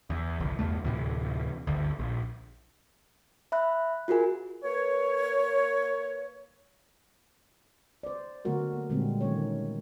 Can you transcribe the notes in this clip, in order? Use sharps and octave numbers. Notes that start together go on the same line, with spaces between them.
E2
G1 C2
E2 G2 A3
D2 A2 C3 E3
G1 D2
A#1
E5 B5 F#6
F4 F#4 G#4 A#4 G#5
A#3 B4 C#5
C5 D5
D3 F#3 A3 B3 F#4 A#4
A#3
A#2 D3 G3 G#3 A#3 C4
D#3 F3 F#3 A3 C#4 C#5
A#4